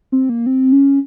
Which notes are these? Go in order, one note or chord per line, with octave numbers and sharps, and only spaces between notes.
C4
A#3
C4
C#4